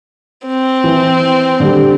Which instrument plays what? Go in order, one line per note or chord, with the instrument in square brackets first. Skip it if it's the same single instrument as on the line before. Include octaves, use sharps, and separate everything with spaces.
[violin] C4
[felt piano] E3
D3 G3